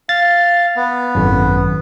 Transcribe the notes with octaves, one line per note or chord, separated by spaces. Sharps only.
F5 A6
B3
G#1 F#2